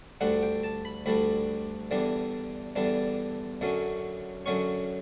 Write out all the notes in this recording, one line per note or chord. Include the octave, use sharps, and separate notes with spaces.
D2 D3 G3 D4 F#5
G5
A5
B5
D2 D3 G3 D4 B5
E2 D3 G3 D4
E2 D3 G3 D4 A5
F#2 D3 F#3 C#4
F#2 D3 F#3 C#4 C#6